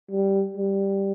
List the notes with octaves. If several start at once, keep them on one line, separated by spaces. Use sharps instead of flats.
G3
G3